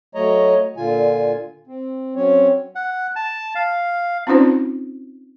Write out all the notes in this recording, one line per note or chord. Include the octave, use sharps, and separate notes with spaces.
F#3 A3 C#5 D#5 A#5
A#2 D3 F4 G#5
C4
F#3 C4 C#4 C#5
F#5
A5
F5
C4 C#4 D#4 F4 C5